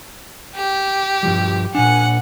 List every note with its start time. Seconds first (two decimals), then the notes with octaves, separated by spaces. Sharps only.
0.56 G4
1.23 G2 F3 G3
1.75 A#2 D4 F#5 G#5